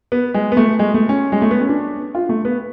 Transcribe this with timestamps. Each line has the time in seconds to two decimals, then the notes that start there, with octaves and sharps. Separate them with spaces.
0.12 B3
0.34 G#3
0.52 B3
0.57 A3
0.79 G#3
0.94 A3
1.09 C#4
1.32 G#3
1.42 A3
1.51 B3
1.61 C#4
1.69 D4
2.15 F4
2.29 A3
2.45 B3